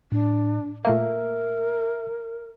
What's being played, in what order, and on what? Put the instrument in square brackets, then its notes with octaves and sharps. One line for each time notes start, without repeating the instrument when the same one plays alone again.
[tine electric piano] A2 [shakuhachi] D4
[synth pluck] A#2 A3 A#3 [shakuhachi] A#4 [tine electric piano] E5